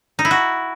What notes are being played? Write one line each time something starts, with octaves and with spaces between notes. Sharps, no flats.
D#4
E4
F#4